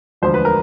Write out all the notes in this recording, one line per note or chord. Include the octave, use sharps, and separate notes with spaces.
E1 D2 D3 F3 C5
B4
A#4